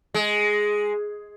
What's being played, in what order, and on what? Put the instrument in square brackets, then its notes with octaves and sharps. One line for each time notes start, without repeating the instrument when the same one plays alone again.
[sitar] G#3